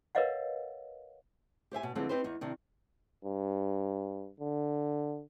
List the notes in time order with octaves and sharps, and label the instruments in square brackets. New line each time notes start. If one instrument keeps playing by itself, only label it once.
[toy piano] A#4 B4 C#5 D#5 F5 F#5
[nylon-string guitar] G4 C5 E5 G#5
B2
D3 E3 F3 G#3 C4 D#4
C4 D#4 G4 B4 C5
E2 D#4
C3 D#3 D4
[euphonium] G2
D3